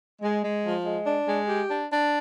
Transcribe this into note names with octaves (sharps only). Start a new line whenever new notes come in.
G#3
G#3
F3
G#3
D4
G#3
G4
D4
D4